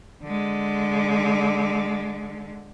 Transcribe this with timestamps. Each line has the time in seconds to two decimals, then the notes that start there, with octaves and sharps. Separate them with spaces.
0.23 D3 G#3